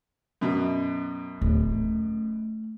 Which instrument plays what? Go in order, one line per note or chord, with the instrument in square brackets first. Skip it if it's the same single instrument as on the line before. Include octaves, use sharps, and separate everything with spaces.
[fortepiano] F#2 B2
[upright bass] D1
A3